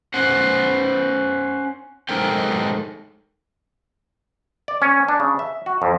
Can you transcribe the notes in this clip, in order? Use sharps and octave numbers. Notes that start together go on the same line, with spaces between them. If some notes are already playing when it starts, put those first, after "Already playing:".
C#4 C5 F#5
G#3 D#4 A4 A#4 C5 G5
D5
C#4
D4
C#3
E5
F#4
F2